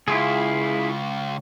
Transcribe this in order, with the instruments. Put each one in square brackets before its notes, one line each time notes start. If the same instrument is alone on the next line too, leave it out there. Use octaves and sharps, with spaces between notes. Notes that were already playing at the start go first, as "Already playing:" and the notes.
[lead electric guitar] C#2 [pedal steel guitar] E4 F4 G#4